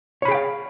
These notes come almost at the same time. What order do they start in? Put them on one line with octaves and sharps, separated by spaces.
C#5 B5 G#4 G5 F5